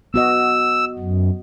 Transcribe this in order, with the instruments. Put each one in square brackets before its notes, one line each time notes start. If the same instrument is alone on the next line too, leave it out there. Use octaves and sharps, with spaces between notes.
[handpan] B3 F#4 D#5 [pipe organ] E6
[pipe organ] F#2